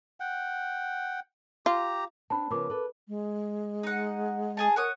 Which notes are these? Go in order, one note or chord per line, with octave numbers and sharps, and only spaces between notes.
F#5 G5
F4 G4 A#5
C4 D4 A5 B5
C#3 F3 B3 A#4 D6
A4 B4
G#3
D#4 F#5
G#4 G#5 A5
F#4 A#4 C#5 D#6